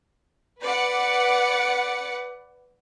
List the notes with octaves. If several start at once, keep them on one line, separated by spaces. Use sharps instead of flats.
B4 D5 F#5 C#7